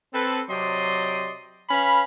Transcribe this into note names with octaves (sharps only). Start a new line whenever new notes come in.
C4 A4 B4
C3 F#3 G4 D5 D#5 C6
C#4 B4 F5 B5